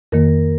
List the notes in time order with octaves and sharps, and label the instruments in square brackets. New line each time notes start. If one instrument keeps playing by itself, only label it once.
[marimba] F2 D#3 A#3 [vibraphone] A#4